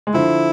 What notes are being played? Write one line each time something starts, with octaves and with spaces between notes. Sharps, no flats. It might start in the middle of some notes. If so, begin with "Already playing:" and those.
G#3
D3 F3 E4